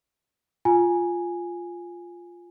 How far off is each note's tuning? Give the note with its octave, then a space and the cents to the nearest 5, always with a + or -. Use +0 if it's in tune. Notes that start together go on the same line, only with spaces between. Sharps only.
F4 +0 G#5 +0